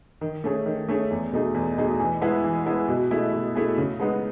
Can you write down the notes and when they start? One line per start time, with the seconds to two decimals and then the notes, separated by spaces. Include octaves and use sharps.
0.21 D#3
0.44 A3 C#4 G#4
0.66 D#3
0.88 A3 C#4 G#4
1.11 E2
1.32 B2 A3 D#4 G#4
1.54 E2
1.77 B2 A3 D#4 G#4
1.99 E3
2.21 G#3 B3 E4 G#4
2.44 E3
2.66 G#3 B3 E4 G#4
2.88 B2
3.11 A3 E4 G#4
3.33 B2
3.55 A3 E4 G#4
3.78 C#3
3.99 G#3 B3 D#4